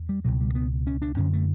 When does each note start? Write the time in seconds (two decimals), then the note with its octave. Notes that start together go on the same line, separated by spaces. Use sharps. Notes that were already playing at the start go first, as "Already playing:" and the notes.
Already playing: E2
0.09 G3
0.25 C#2 B2 F#3
0.41 G3
0.55 B3
0.87 C#4
1.02 D4
1.17 F#2 D3 C#4
1.33 A3